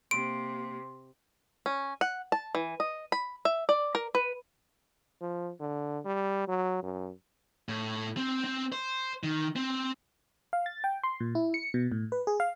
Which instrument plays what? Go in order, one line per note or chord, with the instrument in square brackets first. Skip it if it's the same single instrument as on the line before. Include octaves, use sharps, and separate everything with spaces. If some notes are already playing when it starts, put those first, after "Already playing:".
[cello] C3 [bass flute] A#3 [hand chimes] C6 [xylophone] D7
[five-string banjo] C#4
F#5
A5
E3
D#5
B5
E5
D5
A#4
B4
[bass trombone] F3
D3
G3
F#3
F#2
[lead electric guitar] A2
C4
C4
C5
D#3
C4
[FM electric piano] F5
A6
G5
C6
A#2
E4
C#7
B2
A2
B4
G#4
F5